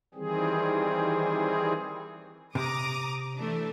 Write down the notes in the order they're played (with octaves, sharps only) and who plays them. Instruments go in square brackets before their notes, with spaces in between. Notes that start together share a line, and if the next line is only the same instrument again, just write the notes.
[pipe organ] D#3 E3 G3 C4 G#4
[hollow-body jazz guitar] C3 [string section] A#5 D6 D#6
[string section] E3 A3 D4